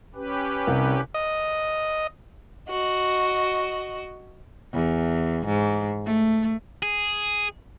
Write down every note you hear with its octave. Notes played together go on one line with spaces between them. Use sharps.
C#4 G4 B4
C2
D#5
F#4 D#5
E2
G#2
A3
G#4